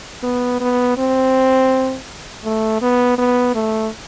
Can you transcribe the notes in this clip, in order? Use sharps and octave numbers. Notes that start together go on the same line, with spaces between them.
B3
B3
C4
A3
B3
B3
A3